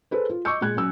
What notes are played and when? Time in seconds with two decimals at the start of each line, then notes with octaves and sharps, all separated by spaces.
0.11 G#4 A4 B4 C5
0.30 F4
0.45 D#5 C#6 D6 E6 G6 C#7
0.61 A#2 G#3 F#6 G#6
0.76 F#3 C#4 E6